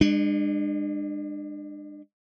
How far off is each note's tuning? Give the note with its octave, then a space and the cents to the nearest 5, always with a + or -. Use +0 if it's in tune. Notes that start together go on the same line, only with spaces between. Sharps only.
G#3 -30 D4 +30